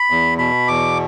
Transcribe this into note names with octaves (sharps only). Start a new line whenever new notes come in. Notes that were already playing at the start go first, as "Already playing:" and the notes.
Already playing: B5
E2
B2 B5
E2 D6